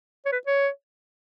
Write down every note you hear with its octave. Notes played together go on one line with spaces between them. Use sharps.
C#5
B4
C#5